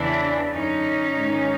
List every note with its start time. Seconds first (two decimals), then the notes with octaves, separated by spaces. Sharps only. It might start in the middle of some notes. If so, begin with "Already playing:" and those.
Already playing: E2 C#3 E3 D4 E4
0.52 F#2 D3 C#4 D#4
1.16 G#2 D#3